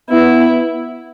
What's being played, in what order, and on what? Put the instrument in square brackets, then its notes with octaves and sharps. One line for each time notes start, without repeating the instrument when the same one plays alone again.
[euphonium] B3 [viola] E4